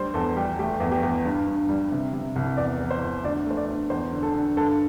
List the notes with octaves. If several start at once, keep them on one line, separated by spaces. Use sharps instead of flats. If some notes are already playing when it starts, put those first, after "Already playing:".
Already playing: D2 G3 C5
E2 A4
G3 G4
A3 G4
E2
G4
E2
G2
G2
G3
C3
C3
C2
E2 D5
E2
C5
E2
D2 D5
A3 C5
D5
D2
E2 C5
D3
A4
D3
G2 A4